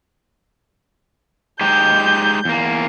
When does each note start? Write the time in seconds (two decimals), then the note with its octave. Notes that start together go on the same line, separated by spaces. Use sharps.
1.61 G#3 D#4 G4 G6
2.45 E2 A#3